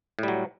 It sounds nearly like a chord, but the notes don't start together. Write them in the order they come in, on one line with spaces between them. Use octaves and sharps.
A2 G3 F#3